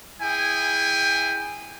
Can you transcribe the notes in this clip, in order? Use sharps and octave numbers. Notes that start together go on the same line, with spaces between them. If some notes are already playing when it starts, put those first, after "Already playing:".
E4 G#4 G5 G#5